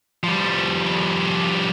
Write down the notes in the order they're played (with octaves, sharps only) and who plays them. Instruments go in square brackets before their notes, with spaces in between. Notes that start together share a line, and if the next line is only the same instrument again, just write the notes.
[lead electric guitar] F3 G3